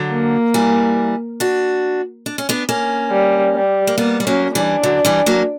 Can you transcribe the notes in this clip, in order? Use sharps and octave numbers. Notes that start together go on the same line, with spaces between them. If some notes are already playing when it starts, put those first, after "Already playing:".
Already playing: D3 F#3
A#3
E3 G3
D4 F#4
D4
C#4
B3 D4
A#3 C#4
G3
G3
A#3
G3 A#3 B3
G3
F#3 A#3 C#4
E3 G3 D4
D3 F#3
E3 G3
F#3 A#3